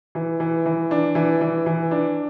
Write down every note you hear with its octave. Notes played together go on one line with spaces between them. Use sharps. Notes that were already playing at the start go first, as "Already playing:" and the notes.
E3
E3
E3
D4
E3
E3
E3
D4